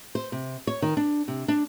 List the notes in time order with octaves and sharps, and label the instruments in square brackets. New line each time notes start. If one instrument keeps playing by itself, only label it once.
[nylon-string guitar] C5
C3
C#5
D#3
D4
C3
D4